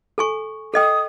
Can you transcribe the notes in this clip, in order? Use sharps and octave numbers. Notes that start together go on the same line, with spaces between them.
A4 G#5 C#6
A4 D#5 G5 D#6